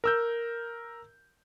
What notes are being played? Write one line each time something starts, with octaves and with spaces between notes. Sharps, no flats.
A#4 E6 G6